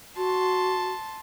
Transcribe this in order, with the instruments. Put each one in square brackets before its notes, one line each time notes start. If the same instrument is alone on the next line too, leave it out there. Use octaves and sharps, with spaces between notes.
[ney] F#4 [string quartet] A5 C6